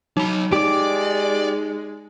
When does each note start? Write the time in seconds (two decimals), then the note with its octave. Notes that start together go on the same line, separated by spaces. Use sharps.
0.17 F#3 D#4 B5
0.53 G#3 G4 D5 D6